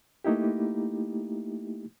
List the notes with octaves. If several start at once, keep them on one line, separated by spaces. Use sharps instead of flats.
A3 A#3 D#4 E4 G4